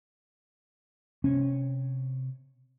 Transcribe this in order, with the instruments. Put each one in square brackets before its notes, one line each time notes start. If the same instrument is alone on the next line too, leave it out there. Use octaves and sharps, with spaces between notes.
[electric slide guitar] C3 C#5 [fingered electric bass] C#4